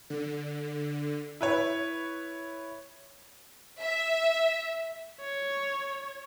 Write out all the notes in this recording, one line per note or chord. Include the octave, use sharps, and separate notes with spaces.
D3
E4 B4 C#5
E5
C#5